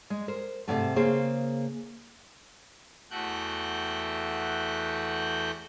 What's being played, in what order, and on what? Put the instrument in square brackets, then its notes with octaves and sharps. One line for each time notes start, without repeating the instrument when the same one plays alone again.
[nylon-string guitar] G#3
A#4 C5
G#2 C3 E3 F#3 A3
C#3 A#3 G#4 C5
[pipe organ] E2 A3 F#4 G5 F#6 G6